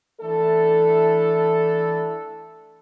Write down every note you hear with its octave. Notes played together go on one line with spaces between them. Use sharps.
E3 A3 D4 E4 A4